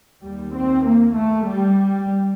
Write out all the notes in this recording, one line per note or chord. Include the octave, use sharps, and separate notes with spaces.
D#2 G3
C4
A#3
A3
G3